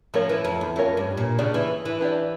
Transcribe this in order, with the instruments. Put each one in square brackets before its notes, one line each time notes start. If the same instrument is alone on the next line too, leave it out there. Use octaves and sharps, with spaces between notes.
[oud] F3 [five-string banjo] A3 C#4 F4 A#4 C#5
[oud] E3
F2
E2
[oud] F2 [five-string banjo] A3 C#4 F4 A#4 C#5
[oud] G2
A#2
[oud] C#3 [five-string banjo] D4 G4 D5
[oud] E3
E3
[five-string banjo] D4 G4 D5